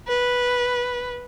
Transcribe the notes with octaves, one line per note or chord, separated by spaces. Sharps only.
B4